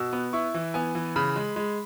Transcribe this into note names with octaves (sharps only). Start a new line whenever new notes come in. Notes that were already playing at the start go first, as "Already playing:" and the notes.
Already playing: B2 E6
B3
E4 C#6
E3
B3 G#5
E3
C#3 B5
G#3
G#3